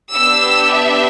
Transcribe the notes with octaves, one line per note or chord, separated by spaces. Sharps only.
B3 D4 G4 E6
E5